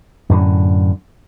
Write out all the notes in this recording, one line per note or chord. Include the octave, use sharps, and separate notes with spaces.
F#2 A2 D3